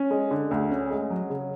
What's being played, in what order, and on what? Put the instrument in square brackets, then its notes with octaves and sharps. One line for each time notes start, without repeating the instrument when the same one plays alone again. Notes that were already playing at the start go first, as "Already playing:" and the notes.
Already playing: [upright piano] C#4
G#3
D3
D2
C#4
G#3
F#3
C#3